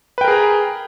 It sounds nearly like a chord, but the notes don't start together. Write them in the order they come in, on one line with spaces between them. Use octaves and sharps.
B4 G5 A#4 G#4 A#5